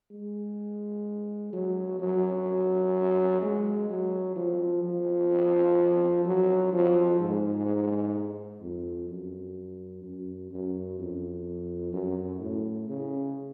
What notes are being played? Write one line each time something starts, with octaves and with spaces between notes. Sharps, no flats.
G#3
F#3
F#3
G#3
F#3
F3
F3
F#3
F3
G#2
F2
F#2
F#2
F#2
F2
F#2
A2
C#3